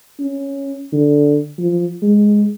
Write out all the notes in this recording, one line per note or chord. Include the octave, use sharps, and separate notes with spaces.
C#4
D3
F3
G#3